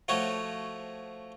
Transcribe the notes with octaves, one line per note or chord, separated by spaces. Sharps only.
F3 A3 F#4 C#5